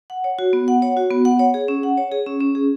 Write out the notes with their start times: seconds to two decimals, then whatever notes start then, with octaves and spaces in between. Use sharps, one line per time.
0.10 F#5
0.24 C#5
0.39 F#4
0.53 B3
0.68 F#5
0.82 C#5
0.97 F#4
1.11 B3
1.25 F#5
1.39 C#5
1.54 G#4
1.68 C#4
1.83 F#5
1.98 C#5
2.12 G#4
2.26 C#4
2.40 C#4
2.55 G#4